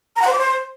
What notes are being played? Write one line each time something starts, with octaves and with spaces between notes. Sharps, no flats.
A#5
F#5
C5
D6
C5